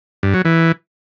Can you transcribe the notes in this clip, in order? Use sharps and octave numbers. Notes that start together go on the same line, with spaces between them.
G2
F#3
E3